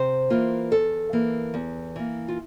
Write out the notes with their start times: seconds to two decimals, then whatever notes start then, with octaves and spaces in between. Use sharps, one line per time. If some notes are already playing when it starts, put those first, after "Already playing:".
Already playing: C3 C5
0.30 E3 A#3 F4
0.71 E2 A4
1.13 E3 A#3
1.54 E2
1.96 E3 A#3
2.28 F4